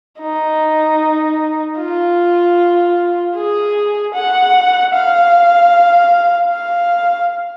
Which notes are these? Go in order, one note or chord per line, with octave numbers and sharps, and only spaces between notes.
D#4
F4
G#4
F#5
F5
F5